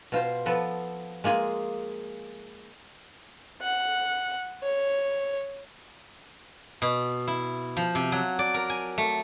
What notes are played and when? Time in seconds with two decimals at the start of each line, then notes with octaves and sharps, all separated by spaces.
0.12 B2 F4 C5
0.46 F3 B3 A4
1.24 G#3 A#3 F4 G#4
3.62 F#5
4.63 C#5
6.82 B2
7.27 E4
7.77 F3
7.95 C3
8.12 F#3
8.39 D5
8.54 A#4
8.70 G#5
8.98 A3